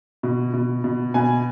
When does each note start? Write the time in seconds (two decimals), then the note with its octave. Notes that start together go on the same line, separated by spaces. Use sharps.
0.23 B2
0.53 B2
0.84 B2
1.14 B2 G#5